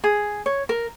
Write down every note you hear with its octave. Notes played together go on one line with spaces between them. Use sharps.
G#4
C#5
A#4